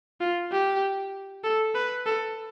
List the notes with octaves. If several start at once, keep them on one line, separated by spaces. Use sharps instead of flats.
F4
G4
A4
B4
A4